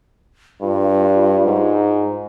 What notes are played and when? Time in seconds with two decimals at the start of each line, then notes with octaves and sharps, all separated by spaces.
0.62 G2 F4
1.46 G#2